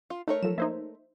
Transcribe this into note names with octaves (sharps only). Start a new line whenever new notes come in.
F4
A3 D#4 A#4 C#5
F3 F#3 A4 E7
A#3 D#4 C5 E5 G#6